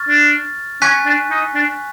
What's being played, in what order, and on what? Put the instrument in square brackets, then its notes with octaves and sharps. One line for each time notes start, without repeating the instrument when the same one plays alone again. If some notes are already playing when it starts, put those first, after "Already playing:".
Already playing: [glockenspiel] C#6 F6 A6
[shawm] D4
[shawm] C#4 [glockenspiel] G#5 C#6 F#6 B6
[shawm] D4
D#4
D4